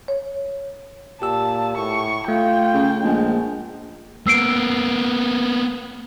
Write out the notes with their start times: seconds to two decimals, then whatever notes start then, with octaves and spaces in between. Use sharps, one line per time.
0.08 C#5
1.22 A#2 G4 A5 E6
1.77 A2 C#6
2.28 A3 F4 G5
2.73 C#3
3.03 A#1 G#3
4.27 A#3 B3 E6 C7 D7